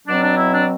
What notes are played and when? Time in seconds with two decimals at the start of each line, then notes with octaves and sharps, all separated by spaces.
0.06 B2 F#3 C4 D4
0.21 D4
0.36 E4
0.51 D4